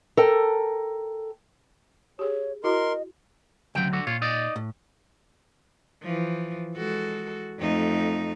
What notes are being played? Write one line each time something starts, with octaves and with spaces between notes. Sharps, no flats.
A4 A#4 G5
G4 G#4 C#5
E4 F#4 A#4 D#5 C6
D2 C#3 F#3 G5
D3 F#4
A#2 F4 C#5
D#4 D5 D#5
A2
E3 F3
G#3 F#4 A4
F2 A3 D#4